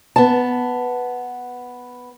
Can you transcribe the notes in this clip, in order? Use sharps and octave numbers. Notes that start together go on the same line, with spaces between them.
B3 A5